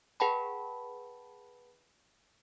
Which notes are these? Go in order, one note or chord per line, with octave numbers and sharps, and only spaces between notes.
G#4 B4 F#5 G5 A5 B5